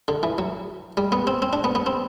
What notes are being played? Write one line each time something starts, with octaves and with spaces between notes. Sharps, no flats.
D3
E3
F#3
G3
B3
C4
C4
D4
B3
B3
C4